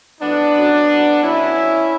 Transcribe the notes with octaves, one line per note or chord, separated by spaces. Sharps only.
A2 F#3 B3 D4
F#2 D3 F#3
A2 F#3
A2 F#3 C#4 E4
B2 F#3